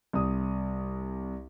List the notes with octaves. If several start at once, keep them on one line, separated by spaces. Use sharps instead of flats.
C2 D#6